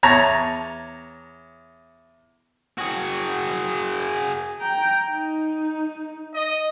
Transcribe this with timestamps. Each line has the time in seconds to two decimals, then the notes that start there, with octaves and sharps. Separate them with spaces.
0.03 E2 C#5 A5 A#5
2.78 F#4 G#4
4.61 G5 A#5
5.09 D#4
6.33 D#5